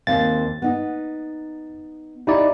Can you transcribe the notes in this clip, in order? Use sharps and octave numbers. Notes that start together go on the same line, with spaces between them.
D#2 C4 F5 A6
B3 D#4
D#4 E4 G4 D5